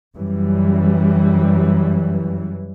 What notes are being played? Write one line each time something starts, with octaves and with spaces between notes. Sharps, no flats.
F#2 E3 G3